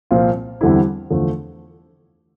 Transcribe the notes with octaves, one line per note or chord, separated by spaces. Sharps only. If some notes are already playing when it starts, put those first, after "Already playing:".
C2 A#2 F3 C4 F4
E2 D3 G3 C4 E4
E2 D3 F3 A3